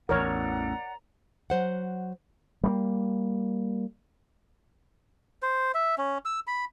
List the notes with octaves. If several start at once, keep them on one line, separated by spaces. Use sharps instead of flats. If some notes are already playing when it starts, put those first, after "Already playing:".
A1 E2 A#4 C#5 D5 F#5 A#5
F#3 C5 F#5
G3 G#3 A#3
C5
E5
C#4
E6
B5